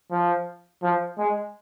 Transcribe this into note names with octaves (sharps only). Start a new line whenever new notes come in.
F3
F3
G#3